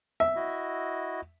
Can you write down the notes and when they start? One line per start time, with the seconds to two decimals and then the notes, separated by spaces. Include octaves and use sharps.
0.20 E5
0.36 E4 F#4 D#5